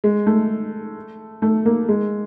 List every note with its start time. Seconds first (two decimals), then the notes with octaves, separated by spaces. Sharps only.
0.04 G#3
0.26 A3
1.42 A3
1.65 A#3
1.88 G#3